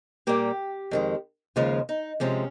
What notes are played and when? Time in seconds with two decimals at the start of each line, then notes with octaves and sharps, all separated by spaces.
0.27 A#2 G3 A#3 G4
0.91 F2 D#3 G#3
1.56 D#2 C#3 F3 G#3 F4
1.89 D#4
2.20 C3 F3 G#3 C#4